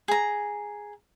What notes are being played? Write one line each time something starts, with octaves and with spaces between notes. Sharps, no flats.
G#4 A#5